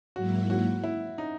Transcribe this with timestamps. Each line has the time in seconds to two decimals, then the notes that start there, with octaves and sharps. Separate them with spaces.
0.16 G#2 F#3 A#3 E4 F#4
0.50 F#4
0.84 E4
1.18 D#4